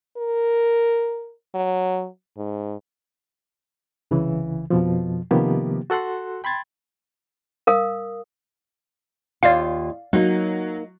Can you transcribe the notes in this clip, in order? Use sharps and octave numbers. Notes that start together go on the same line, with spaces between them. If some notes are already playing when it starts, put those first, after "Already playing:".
A#4
F#3
G#2
C2 C#3 E3
F2 B2 F3
C3 D#3 F3 A#3 B3 G4
F#4 A4 F#5 C6 F#6
G5 B5 C6 G#6 A6
A#4 F5 D#6
D#2 F4 D5 F5
F#3 A#3 D#4